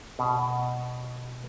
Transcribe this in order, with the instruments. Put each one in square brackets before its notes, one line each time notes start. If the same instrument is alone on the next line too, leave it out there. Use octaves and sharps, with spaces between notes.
[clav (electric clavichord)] B2